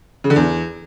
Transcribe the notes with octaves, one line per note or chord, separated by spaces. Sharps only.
C#3
D3
E2